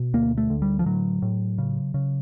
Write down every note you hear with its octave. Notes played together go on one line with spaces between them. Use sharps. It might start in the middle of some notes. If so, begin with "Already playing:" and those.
Already playing: B2
D2 A#3
A3
D3
G3
F3
A2 F#3
A2
C#3
C#3